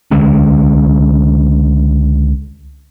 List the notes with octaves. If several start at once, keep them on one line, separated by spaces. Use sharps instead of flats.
C#2 D3 G#3 C#4